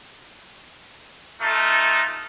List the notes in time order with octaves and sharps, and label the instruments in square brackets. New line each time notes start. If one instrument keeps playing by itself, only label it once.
[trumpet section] A3 D#4 F4